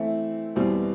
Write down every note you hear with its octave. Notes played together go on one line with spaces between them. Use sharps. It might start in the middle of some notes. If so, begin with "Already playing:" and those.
Already playing: E3 A3 C4 E4
E2 B2 G3 C4